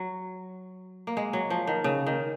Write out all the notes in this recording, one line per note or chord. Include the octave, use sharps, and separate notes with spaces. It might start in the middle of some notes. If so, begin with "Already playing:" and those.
Already playing: F#3
A#3
G#3
F#3
F3
D#3
C#3
D#3